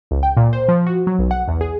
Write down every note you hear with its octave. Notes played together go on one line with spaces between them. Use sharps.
C#2
G5
A#2
C5
F3
F#4
F#3
B1
F#5
E2
G#4